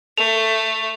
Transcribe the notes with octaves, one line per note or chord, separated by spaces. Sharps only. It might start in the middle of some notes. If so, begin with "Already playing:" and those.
A3 F7